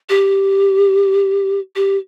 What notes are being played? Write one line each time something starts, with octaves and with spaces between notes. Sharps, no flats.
G4
G4